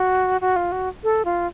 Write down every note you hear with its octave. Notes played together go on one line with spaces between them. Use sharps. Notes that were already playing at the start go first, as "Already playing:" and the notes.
Already playing: F#4
F#4
F4
F#4
A4
F4